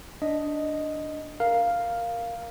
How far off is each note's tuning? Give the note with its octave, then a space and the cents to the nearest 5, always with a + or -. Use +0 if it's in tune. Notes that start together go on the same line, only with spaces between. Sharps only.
D4 +0 D#5 +0
A#4 +0 F5 +0